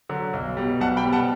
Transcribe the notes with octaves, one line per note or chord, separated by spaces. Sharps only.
D3 F#3
B1
B2 G3
B1 F#5 A5
G5 B5
B2 G3
F#5 A5